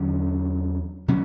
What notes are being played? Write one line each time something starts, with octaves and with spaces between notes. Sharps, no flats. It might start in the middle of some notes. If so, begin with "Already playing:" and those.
Already playing: E2 D3 F#3 C#4
B2 F#3 C#4